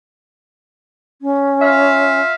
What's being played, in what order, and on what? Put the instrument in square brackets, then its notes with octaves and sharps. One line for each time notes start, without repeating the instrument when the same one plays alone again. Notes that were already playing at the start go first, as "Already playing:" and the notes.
[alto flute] C#4
[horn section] F4 E5 F5